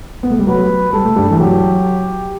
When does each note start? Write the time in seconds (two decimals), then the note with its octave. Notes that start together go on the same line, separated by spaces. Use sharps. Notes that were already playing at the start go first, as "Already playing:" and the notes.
0.23 B3
0.30 A3
0.39 G3
0.47 F#3 B4
0.93 G3 A4
1.05 A3
1.16 G2 G3
1.31 E3
1.39 F#3 G4